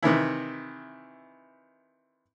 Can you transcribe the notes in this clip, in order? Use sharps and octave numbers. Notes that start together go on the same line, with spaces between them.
C3 D#3 E3 E4